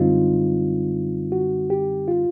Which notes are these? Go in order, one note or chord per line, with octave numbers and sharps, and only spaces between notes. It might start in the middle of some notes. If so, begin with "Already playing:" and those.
Already playing: F#2 D3 G3 C4 D#4 F4
F#4
G4
F4